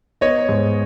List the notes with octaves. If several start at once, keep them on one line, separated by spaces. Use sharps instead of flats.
B3 C#5 D#5
G#2